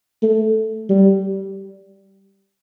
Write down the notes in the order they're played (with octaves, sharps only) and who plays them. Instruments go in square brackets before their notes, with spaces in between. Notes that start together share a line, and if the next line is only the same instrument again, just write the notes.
[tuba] A3
G3